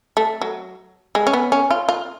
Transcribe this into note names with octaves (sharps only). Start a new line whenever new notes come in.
A3
F#3
G#3
C#4
B3
C#4
F4
F4